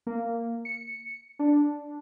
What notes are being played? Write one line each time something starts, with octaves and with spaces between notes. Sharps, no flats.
A#3
C#7
D4